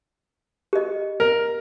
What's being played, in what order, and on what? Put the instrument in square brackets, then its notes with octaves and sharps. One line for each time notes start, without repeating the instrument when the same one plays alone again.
[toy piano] G4 D#5
[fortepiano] A#4